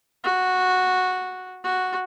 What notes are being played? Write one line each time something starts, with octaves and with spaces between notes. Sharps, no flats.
F#4
F#4